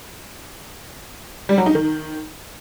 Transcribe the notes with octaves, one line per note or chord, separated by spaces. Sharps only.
G3
F#3
D#4
D#3